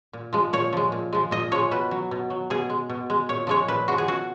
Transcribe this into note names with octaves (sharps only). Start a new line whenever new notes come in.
A#2
F3 G#3
A#2 C#5
F3 G#3
A#2
F3 G#3
A#2 D#5
F3 G#3 C#5
B2 B4
F#3
B2
F#3
B2 G#4
G#3
B2
G#3
A#2 C#5
F3 G#3 C#5
A#2 B4
F3 G#3 F#4
G#4
B2 F#4